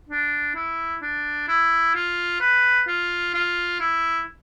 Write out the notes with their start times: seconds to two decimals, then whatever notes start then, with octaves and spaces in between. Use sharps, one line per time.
0.09 D4
0.55 E4
1.02 D4
1.48 E4
1.95 F4
2.41 B4
2.88 F4
3.34 F4
3.80 E4